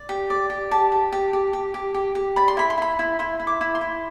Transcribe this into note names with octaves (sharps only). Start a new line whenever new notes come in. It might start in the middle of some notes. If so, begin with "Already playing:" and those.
Already playing: D5
G4
D5
G4
G4 A5
G4
G4
G4
G4
G4
G4
G4
D5 B5
C6
E4 B5
C6
E4 B5
E4
E4 C6
E4
D6
E4
C6
E4